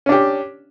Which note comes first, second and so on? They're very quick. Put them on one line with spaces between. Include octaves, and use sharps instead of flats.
C#4 D4 G4